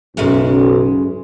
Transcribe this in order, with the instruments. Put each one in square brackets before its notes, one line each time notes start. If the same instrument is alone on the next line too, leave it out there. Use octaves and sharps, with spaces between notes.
[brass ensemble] B1 [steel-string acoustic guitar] F#2 C#3 G#3